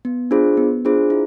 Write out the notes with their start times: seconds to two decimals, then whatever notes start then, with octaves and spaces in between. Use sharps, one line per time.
0.05 B3
0.31 D4 F4 G#4 C5
0.57 B3
0.85 D4 F4 G#4 C5
1.10 E4